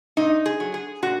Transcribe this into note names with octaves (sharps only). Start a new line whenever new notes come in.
A#2 D#4
G#4
F#3
G#4
A#2 F#4